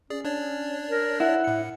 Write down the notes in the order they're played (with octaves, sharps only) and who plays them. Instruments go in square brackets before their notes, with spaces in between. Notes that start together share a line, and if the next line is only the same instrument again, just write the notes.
[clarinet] C#4 [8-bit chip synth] G#4 D5
[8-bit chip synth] D4 C#5 D5
[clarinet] A#4
[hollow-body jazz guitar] E4 [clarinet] F#5
[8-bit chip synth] A2 C#7